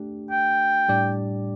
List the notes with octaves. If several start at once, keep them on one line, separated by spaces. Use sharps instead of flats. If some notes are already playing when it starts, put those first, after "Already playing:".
Already playing: A3 D4 G4
G5
A2 G3 D4 G4 D5